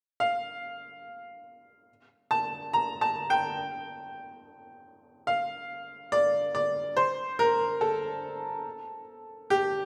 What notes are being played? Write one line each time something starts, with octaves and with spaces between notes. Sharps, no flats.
F5
A5
A#5
A5
G5
F5
D5
D5
C5
A#4
A4
G4